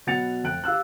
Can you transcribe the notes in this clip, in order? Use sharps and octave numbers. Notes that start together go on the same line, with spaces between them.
B2 F#3 F#5 A6 C#7 F7
F1 G5 F#6 D7
G4 F5 E6 F#6